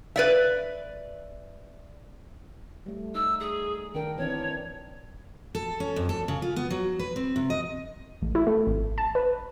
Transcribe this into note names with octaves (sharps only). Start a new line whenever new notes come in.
B4 D5 E5
G3 A3
D#4 E6
G#4
D#3 D4 A#4 G5
E3 C4 D4 C#5
A4
C#4
F2
A4
C#3
F4
B3
F#3
B4
C4
C3
D#5
A1
E4
A3
G#1
A5
B4